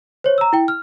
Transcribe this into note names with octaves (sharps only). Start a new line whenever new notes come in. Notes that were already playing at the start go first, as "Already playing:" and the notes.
C5 C#5
A#5 E6
E4 G5
F6